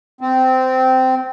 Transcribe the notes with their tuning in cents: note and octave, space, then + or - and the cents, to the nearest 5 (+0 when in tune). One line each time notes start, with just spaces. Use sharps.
C4 -15